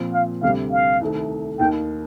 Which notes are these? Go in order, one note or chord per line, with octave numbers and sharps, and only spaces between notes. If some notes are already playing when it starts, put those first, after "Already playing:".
Already playing: A#2 F3 C4 F4
F5
D2 C3 G3 F5
F5
C2 C3 D#3 A3
D#2 D#3 A#3 D#4 G5